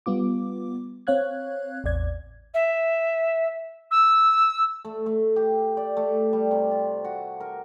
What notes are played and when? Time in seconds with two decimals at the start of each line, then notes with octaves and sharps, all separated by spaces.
0.06 G3 B3 F4 D6
1.07 C4 C#5 F5 F#6 G#6
1.84 A1 E2 D5 G#6
2.54 E5
3.90 E6
4.85 A3
5.06 A3
5.36 G4
5.77 D5
5.97 A3
6.33 G3
6.51 C3
6.71 F4
7.04 F#4
7.40 A#4